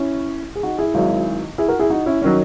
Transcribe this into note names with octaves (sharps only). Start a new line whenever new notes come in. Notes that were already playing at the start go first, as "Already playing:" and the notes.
Already playing: C#4 E4
G#4
D#4 F#4
E4 G#4
G#1 G#2 D#3 F#3
E4 G#4
F#4 A#4
E4 G#4
D#4 F#4
C#4 E4
D#3 F#3 C#4